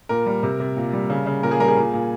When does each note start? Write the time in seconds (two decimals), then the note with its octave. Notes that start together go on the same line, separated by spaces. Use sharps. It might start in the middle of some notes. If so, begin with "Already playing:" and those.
0.09 A#2 A#4
0.26 G3
0.43 C3
0.60 C3
0.77 A#2
0.93 G3
1.10 C#3
1.26 C#3
1.43 A#2 A#4
1.51 G#4
1.60 G3 A#4
1.68 G#4
1.77 A#2
1.94 A#2